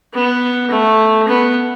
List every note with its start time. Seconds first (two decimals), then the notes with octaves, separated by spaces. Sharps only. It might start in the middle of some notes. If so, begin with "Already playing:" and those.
0.14 B3
0.71 A3
1.28 B3